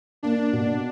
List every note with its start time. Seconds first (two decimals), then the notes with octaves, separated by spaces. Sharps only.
0.23 A#3 D4
0.53 B2